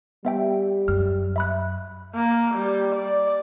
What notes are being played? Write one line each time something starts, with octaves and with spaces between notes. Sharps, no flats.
G3 B3 E5 G5
F#2 F6
E5 B5 F#6
A#3
G3
D5